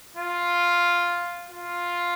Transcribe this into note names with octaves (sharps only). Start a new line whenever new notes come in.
F4
F4